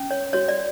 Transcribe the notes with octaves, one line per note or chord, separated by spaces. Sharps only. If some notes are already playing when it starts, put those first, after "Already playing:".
Already playing: C#4
C#5
F#4 C#5
D5